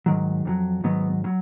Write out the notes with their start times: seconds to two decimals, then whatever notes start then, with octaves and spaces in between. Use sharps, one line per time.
0.06 G#2 D#3 F#3
0.45 F2 D#3 F#3
0.84 G#2 D#3 F#3 B3
1.24 D#3 F#3